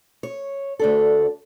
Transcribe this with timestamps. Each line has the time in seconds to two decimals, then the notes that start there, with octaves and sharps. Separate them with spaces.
0.23 C#5
0.79 D2 D4 A4